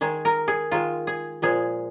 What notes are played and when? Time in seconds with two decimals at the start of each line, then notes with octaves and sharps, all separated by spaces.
0.01 D#3 G#3 G#4
0.25 A#4
0.48 G#4
0.72 D#3 G#3 F4
1.07 G#4
1.42 A#2 F3 G#3 G#4